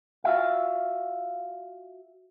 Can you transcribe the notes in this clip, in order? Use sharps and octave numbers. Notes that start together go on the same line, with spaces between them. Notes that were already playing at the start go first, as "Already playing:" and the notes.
F4 F#4 E5 F5